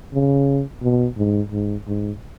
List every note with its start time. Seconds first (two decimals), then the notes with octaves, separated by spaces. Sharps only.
0.14 C#3
0.82 B2
1.17 G#2
1.51 G#2
1.87 G#2